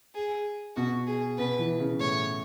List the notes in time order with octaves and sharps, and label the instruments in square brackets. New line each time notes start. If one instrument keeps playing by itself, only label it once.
[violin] G#4
[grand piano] B2 [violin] F#4
[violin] G#4
[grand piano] B2 [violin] B4
[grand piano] E3
C#3
[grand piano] A2 [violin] C#5